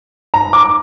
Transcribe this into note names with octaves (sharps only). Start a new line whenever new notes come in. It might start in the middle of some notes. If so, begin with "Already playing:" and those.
A#5
D6